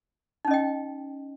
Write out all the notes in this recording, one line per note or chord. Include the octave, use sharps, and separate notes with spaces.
C#4 D#4 D#5 G5